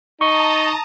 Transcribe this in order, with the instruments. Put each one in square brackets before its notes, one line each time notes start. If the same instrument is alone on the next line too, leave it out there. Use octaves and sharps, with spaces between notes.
[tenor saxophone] D#4 [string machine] A5 A#5 D#6 [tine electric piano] C#6